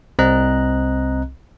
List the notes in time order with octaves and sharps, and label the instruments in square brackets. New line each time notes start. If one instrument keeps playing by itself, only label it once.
[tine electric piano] C2 C4 D#5 A#5 F#6